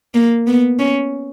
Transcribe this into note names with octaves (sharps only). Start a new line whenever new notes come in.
A#3
B3
C#4